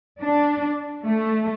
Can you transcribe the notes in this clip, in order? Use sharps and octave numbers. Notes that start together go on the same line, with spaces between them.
D4
A3